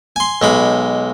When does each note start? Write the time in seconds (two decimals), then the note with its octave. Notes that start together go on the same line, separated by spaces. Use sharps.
0.16 G#5 C6
0.42 B1 G#3 B5